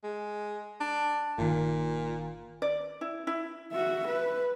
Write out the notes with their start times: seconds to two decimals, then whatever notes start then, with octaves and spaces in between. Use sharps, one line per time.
0.04 G#3
0.80 D4
1.38 G1 A#2 D#3
2.62 D5
3.01 E4
3.27 E4
3.72 F#4 E5
4.08 B4